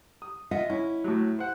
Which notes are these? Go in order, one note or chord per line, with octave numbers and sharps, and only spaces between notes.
D#6
F4 D#5 E5 F#5
C#4 E4
A2 F#3
C5 F#5